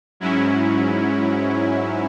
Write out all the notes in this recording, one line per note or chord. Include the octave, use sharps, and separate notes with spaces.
G#2 F#3 C#4 E4